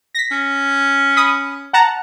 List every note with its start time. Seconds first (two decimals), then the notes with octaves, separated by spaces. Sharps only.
0.15 A#6 B6
0.31 C#4
1.16 B5 D#6
1.73 F#5 A5 A#5